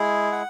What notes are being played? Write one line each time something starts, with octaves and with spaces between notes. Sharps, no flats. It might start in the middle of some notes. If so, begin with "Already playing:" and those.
Already playing: G#3 E4 G#4
F#5